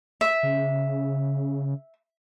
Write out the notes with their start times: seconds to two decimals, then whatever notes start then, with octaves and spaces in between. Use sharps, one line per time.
0.21 E5
0.43 C#3